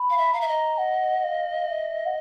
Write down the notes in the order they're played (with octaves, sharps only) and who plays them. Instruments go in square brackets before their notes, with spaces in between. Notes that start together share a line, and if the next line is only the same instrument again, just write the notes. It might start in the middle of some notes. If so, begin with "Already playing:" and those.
Already playing: [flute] B5
[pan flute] F5
E5
[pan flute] F5 [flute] A#5
[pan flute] E5
D#5
[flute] F#5
F5
E5
F#5